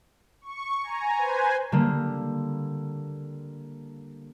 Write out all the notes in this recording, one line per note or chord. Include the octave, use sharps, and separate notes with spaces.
C#6
G#5 A#5
B4 C5 G#5
D3 G3 A#3